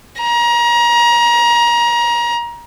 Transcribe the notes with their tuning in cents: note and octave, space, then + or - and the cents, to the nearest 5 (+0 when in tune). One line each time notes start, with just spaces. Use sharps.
A#5 +30